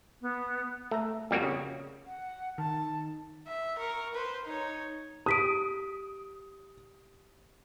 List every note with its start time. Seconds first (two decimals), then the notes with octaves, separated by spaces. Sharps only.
0.22 B3
0.91 A3 A#5
1.31 F2 G3 A#3 F#4
1.43 C#3
2.06 F#5
2.58 D#3 A5
3.47 E5
3.78 A#4 C#6
4.14 B4 C5
4.46 D#4 C#5
5.26 G4 D#6 B6 D7